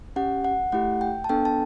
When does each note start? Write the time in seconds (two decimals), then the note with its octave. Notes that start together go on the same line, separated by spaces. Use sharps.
0.16 C#4 G4 F#5
0.44 F#5
0.72 A3 E4 G4 F#5
1.01 G5
1.24 A5
1.29 B3 D4 A4 G5
1.45 A5